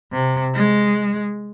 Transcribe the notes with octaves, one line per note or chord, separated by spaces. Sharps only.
C3
G#3